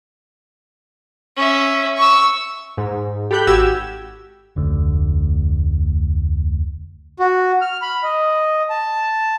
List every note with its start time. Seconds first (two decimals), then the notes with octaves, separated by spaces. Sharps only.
1.36 C#4 E5
1.97 C#6 E6
2.77 G#2
3.31 G4 A4 B5 F#6 G6
3.47 G#1 F#4 G4 E6 G#6
4.56 F1 D2 D3
7.20 F#4
7.61 F6
7.82 B5
8.03 D#5
8.70 A5